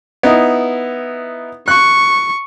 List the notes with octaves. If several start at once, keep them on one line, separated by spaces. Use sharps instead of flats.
B3 D#4 E4
C#6 F#6